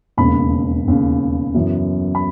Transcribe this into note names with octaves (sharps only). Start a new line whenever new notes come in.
E1 D#2 C#3 B5
E1 D#2 C#3
F#2 C#3 E3 B3
B5